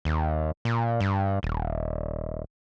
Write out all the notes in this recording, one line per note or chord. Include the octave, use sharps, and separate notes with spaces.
D#2
A#2
G2
D#1